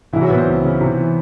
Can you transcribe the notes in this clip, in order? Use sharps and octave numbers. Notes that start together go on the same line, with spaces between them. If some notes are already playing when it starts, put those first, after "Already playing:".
C2 E3 E4
F#3 F#4
A#2 B3 B4
C4 C5
C#2
C#3
C3
E3